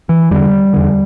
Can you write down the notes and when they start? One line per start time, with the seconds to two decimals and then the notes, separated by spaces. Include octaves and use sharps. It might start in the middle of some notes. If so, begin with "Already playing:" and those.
0.09 E3
0.31 E2 D3 G3
0.73 E2 D3